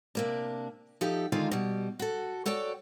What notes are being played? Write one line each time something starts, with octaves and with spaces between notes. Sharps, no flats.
C3 A#3 D4
F3 D#4 G4 A4 E5
D3 D#3 G#3 D#4 F4 F5
B2 G3
F#4 A4
F#4 A4 C#5 D5 G5